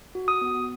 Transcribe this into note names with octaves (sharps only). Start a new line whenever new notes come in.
F#4
D#6
B3